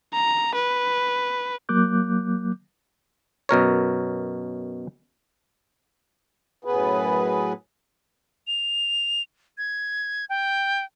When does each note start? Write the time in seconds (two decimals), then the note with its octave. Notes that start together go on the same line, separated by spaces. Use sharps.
0.13 A#5
0.55 B4
1.69 F#3 A#3 D6 F#6 G6
3.49 F#2 B2 A#4 C#5
6.65 F#2 A2 B3 G#4 B4
8.47 F7
9.58 G#6
10.29 G5